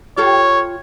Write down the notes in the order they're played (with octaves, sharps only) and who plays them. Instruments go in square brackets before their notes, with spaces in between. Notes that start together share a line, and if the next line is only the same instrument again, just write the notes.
[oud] F4 G4 A4 [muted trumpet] C#5